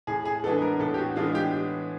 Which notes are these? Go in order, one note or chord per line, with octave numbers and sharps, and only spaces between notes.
A2 G#4
G#4
E3 G#3 B3 D4 A4
A#4
A2 A4
G4
F#4
E3 G#3 B3 D4 F4
G4